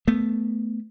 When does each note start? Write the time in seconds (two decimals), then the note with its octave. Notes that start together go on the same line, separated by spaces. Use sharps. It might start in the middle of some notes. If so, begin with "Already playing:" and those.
0.08 A3 B3